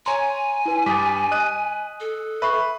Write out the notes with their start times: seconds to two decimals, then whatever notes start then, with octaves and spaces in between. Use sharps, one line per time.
0.06 C#5 G#5 A#5 C6
0.66 E4 B4
0.86 G2 G3 D6 D#6 A6 B6
1.31 D#5 D#6 F#6 D#7
2.00 A4
2.42 B4 E5 B5 C#6 C7